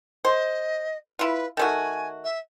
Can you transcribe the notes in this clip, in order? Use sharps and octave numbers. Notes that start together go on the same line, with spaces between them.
C5 D#5
E4 F4 B4
D#3 A3 F#4 G#5
E5